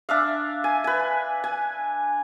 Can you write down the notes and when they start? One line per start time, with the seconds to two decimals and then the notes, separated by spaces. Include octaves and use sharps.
0.09 D4 E5 F5
0.64 G#5
0.84 B4 G#5
1.44 G#5